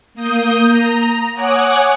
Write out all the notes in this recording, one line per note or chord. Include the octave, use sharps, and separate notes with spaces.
A#3 D#6 G6
A#5
C#5 F#5 G#5 D6 D#6 F#6